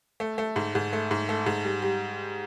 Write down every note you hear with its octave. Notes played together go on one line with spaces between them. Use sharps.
A3
A3
G#2
G#2
A3
G#2
A3
G#2
G3
G3